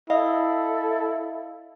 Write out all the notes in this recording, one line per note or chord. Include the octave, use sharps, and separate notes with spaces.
E4 A4 D#5 F5